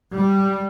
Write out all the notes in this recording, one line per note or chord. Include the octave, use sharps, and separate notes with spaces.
G3